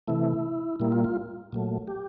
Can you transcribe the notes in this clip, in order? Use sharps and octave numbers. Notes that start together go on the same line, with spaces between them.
C3 E3 A3 E4
A#2 G3 A#3 E4
F4
F4
A#2 F#3 A3
G4